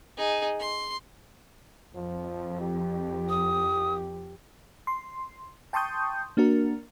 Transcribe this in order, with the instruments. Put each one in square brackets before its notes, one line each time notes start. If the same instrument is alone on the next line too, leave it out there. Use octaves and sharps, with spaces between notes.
[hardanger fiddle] D#4 G#4
C6
[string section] F2 [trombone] F3
[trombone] G4
[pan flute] D#6
[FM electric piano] C6
G5 A5 C6 C#6 D#6 G6
A#3 D4 F#4 A#4